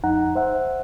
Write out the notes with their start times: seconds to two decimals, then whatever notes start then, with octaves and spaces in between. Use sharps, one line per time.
0.04 F2 D#4 F#5 A#5
0.35 C5 E5 F#5